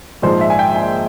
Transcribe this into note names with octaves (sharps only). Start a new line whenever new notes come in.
A#1 G#2 F3 G#3 C5
E5
G#5
G5
G#5